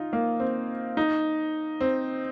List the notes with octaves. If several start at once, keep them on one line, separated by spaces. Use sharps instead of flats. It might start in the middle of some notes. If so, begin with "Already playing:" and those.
Already playing: D#4 F4
A#3
C4
D#4
C4